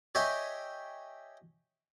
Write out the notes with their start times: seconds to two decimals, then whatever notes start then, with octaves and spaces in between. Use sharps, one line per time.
0.15 G4 C#5 D#5 E5 G5 G#5